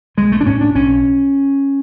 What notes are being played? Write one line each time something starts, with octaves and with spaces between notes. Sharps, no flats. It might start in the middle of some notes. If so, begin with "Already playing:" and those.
B1 G#3
A3
D4
A2 C#4
D4
B1 C#4